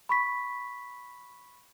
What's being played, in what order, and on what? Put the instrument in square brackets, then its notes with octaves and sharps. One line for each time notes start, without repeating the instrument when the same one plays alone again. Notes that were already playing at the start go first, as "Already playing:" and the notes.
[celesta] B5 C#6 B6